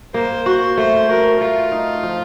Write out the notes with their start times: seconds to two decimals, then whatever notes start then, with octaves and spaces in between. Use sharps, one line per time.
0.14 A#3 C5
0.46 F#4
0.77 A3 C5
1.09 F#4 A#4
1.40 A3 F4
1.72 D#4
2.03 F3